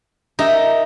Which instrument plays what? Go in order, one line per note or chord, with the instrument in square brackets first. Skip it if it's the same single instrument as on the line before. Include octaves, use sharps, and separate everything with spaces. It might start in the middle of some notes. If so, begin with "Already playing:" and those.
[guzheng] D#4 [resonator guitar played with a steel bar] G4 A#4 E5